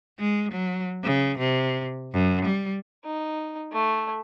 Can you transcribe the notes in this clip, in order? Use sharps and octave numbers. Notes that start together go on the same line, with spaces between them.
G#3
F#3
C#3
C3
F#2
G3
D#4
A3